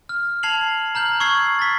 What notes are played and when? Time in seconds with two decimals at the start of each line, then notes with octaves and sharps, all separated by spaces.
0.09 F6
0.43 A5 G#6 C7 F7 F#7
0.95 A#5 F6 G6 F#7
1.20 C#6 E6 G#6 C7
1.59 A6 B6